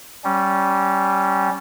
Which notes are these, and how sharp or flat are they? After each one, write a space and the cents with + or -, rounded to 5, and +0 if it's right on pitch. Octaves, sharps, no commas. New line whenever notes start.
G3 -15 C#4 +0